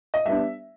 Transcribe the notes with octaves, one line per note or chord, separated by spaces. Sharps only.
D#5
G3 B3 D4 E5